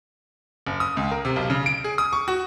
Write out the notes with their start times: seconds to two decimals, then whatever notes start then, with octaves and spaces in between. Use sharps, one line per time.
0.67 F#1
0.80 D#6
0.97 C#2
1.11 A#4
1.25 C3
1.36 B1
1.50 C#3
1.66 D7
1.84 G#4
1.98 D#6
2.13 C#6
2.28 F#4